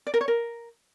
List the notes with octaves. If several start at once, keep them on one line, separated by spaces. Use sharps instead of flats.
D5
A#4
C#5
A#4